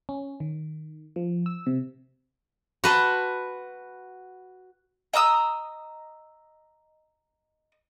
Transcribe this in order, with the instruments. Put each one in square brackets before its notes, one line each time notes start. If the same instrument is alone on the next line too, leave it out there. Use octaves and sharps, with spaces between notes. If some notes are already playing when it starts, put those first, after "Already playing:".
[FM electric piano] C#4
D#3
F3
E6
C3
[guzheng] F#4 B4 A5 C6
[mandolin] D#5 A#5 D#6 E6